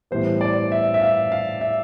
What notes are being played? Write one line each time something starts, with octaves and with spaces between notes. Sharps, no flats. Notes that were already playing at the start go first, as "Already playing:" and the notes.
A2 E3 G3 B3 C5
D5
E5
E5
F5
F5
E5